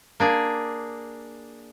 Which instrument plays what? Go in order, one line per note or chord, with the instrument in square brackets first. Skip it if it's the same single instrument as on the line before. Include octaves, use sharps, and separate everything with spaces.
[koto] A#3 D4 G#4